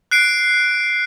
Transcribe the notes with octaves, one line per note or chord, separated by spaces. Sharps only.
F#6 C7 D7